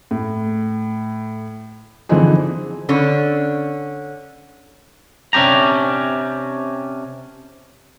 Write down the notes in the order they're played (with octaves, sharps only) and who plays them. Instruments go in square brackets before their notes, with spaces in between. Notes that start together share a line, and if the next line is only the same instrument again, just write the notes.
[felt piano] A2
D3 E3 F3 C4 D#4 G#4
[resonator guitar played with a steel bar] D3 C#4
[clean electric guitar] C3 C#4 D4 G4 A#5